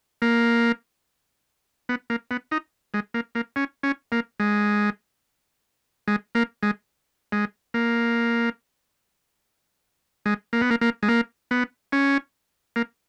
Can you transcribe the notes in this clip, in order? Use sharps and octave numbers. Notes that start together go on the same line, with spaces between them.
A#3
B3
A#3
B3
D#4
G#3
A#3
A#3
C#4
C#4
A#3
G#3
G#3
A#3
G#3
G#3
A#3
G#3
A#3
B3
A#3
A#3
G#3
A#3
B3
C#4
A#3